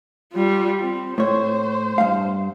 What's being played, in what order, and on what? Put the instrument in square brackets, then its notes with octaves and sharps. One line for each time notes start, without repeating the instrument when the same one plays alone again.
[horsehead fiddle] G3 F4
C4
[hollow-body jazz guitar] A2 C#5 [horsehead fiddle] C5
[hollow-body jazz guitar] G2 F5